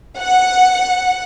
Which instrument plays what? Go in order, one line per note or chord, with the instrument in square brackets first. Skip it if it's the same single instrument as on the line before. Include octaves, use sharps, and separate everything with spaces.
[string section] F#5